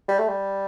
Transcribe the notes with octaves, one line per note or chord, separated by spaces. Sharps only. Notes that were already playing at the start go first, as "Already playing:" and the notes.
G3
A3
G3